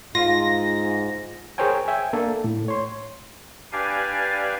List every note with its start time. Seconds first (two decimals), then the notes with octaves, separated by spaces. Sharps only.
0.15 G#2 F4 A#6
1.58 G#4 A#4 C5 C#5 G5 G#5
1.88 E5 G5 G#5
2.13 A#3 D4 A4
2.44 A2
2.68 C#5 C6
3.72 D4 G4 B4 D5 F5 G#5